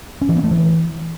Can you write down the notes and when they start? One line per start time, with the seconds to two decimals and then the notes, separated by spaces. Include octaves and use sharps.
0.21 C#4
0.29 E3
0.36 B3
0.44 A3
0.51 E3